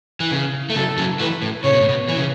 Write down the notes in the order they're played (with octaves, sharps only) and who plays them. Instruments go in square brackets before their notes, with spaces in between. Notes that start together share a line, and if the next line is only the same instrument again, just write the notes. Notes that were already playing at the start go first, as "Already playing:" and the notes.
[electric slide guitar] E3
C#3
A3
[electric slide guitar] C#3 F#3 [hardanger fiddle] A4
[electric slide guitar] C#3 F#3
[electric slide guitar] E3 A3 [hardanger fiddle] B4
[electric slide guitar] A2
[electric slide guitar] C#3 [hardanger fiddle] C#5
[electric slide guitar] B2
A2
B2
E3
C#3